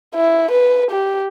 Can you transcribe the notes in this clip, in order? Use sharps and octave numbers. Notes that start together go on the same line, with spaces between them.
E4
B4
G4